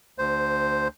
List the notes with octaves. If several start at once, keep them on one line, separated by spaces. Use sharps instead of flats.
D2 C5